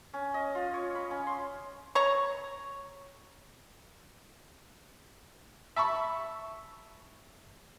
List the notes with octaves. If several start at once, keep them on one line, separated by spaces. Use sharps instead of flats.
C#4
D#5
F4
C#5
B5
C#4
C6
C#5 A#5
E5 A5 B5 C#6